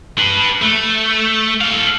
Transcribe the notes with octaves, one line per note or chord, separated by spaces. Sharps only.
D4 B4
A3
A4 F5